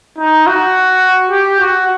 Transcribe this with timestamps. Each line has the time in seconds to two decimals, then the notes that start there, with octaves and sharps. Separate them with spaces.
0.18 D#4
0.47 F#4
1.31 G4
1.60 F#4